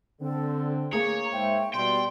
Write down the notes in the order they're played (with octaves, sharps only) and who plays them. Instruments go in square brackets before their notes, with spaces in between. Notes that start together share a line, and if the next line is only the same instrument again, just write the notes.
[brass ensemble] D3 C4 [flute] A4
[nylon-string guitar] A#3 G#4 [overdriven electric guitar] C#5 [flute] A#5
[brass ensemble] G#2 C5 E5 [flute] G5
[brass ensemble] B2 G3 [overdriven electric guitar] G5 [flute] C6